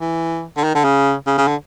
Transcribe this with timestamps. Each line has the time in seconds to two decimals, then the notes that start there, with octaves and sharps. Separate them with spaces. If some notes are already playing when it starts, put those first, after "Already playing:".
0.01 E3
0.57 D3
0.64 D#3
0.75 D3
0.84 C#3
1.27 C#3
1.38 C#3
1.48 D3